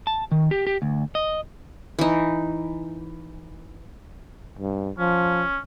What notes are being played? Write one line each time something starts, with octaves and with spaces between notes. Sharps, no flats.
A5
D#3
G4
G4
D2
D#5
E3 D#4
G2
F3 C#4